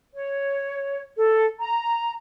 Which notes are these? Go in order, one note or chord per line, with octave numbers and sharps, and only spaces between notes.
C#5
A4
A#5